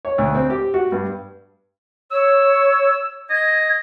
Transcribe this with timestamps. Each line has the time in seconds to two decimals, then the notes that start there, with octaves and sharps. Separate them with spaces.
0.05 C#5
0.18 D2
0.35 C4
0.50 G4
0.74 F#4
0.92 G2
2.11 C#5 E6
3.30 D#5 G#6